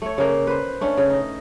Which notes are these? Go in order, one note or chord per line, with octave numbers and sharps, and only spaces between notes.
A3 C#5
C#3 A#3
B4 C5
A3 C#4 D4
C#3
D#4